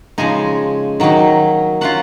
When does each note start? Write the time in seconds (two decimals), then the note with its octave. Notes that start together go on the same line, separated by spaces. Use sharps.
0.18 C#3 F3 G#3 D#4 G#5
1.00 D#3 F#3 A#3 D#4
1.81 F#3 C#4 F4 F#5